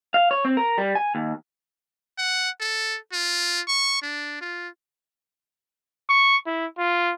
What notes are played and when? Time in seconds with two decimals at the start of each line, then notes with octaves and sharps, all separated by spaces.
0.14 F5
0.31 C#5
0.45 C4
0.57 A#4
0.78 G3
0.95 G#5
1.15 D#2
2.18 F#5
2.60 A4
3.13 F4
3.68 C#6
4.02 D4
4.41 F4
6.09 C#6
6.47 E4
6.78 F4